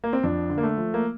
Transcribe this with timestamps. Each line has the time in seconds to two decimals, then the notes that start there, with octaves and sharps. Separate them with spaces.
0.04 A#3
0.13 C4
0.23 F2 D4
0.50 D3
0.58 A#3
0.63 A3
0.77 F3
0.94 A#3